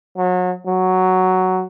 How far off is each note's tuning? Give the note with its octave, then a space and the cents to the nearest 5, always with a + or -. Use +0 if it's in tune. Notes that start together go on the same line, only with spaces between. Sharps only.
F#3 -30
F#3 +5